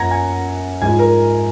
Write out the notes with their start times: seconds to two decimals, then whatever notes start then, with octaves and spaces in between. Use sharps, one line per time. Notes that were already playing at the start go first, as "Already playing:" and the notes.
Already playing: F#2 F3 A#3 F#5 A#5 G#6 A#6
0.11 G#5 G#6
0.81 G#2 F3 G#3 G#5 G#6
0.99 A#4 A#5